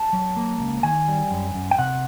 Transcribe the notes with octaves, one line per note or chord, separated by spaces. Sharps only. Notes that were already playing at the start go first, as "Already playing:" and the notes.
Already playing: A5
F#3
A#3
C#2
D#3 G#5
G3
F#2
F#2
G5
C3 F#5